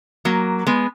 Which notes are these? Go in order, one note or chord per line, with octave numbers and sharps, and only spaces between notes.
F#3 A#3
G#3 B3